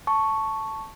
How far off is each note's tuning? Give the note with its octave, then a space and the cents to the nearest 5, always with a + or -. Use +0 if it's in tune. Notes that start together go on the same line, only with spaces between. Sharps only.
A5 +0 C#6 +0